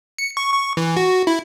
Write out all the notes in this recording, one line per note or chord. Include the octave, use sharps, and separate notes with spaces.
C#7
C#6
C#6
E3
F#4
E4